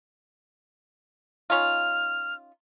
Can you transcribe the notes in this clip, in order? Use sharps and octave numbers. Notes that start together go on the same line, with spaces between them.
C#4 D#4 F4 F6